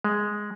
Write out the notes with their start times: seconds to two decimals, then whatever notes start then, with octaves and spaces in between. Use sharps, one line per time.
0.04 G#3